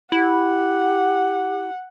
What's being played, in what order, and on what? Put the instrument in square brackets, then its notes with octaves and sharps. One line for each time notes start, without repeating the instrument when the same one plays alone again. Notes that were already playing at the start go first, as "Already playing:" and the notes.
[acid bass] E4 [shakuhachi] G4 [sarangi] F#5